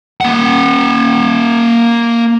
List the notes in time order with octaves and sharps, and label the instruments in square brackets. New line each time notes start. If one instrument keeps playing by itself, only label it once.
[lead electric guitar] A#3 F#5